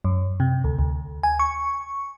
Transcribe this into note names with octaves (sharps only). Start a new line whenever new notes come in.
F#2
C3
D2
D2
G#5
C#6